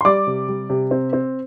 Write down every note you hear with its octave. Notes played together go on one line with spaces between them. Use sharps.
C6
G3 D5 D6
C3
G3
C3
C4
C4